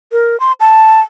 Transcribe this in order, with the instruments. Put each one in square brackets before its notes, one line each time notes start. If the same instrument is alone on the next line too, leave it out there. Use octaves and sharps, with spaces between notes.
[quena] A#4
C6
A5